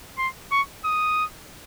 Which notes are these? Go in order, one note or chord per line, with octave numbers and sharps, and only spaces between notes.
C6
C#6
D#6